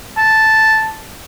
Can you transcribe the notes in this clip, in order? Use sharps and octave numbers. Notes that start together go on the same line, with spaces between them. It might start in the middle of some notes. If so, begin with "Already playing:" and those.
A5